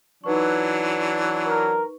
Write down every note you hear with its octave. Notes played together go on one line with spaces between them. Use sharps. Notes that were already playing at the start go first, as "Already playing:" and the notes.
E3 F#3 D4 D#4 B4 C#6
A#4